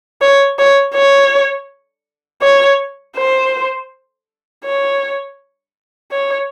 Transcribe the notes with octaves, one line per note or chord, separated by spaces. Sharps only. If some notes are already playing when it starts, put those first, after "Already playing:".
C#5
C#5
C#5
C#5
C5
C#5
C#5